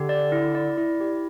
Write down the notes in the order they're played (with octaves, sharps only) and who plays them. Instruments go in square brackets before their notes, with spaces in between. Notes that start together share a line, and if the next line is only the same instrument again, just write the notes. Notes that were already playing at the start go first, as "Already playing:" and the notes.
Already playing: [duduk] D3 [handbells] G4
[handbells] D5
E4
D5
E4
G4